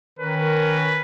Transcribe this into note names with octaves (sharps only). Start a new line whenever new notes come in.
D#3 C#4 A#4 B4